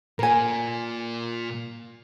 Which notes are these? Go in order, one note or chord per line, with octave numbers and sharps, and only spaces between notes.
A#2 A#4 G#5